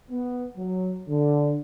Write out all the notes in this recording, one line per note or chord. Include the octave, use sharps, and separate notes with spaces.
B3
F#3
D3